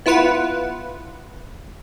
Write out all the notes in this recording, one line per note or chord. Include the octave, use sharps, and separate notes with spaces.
B3 E4 F4 B4 F#5